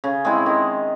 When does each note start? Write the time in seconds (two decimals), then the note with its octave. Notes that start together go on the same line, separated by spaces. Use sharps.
0.04 C#3
0.25 G#3 C4 E4
0.46 D#3